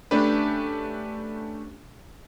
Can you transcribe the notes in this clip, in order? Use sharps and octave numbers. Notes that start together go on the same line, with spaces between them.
A3 C#4 D4 G4 B4